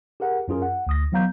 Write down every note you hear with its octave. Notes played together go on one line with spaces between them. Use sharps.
G4 G#4 A#4 F#5
F#2 C#4 F4 G#4 A#4
F#5
D2 D#6 A#6
E3 F#3 B3 F5 A#5 G6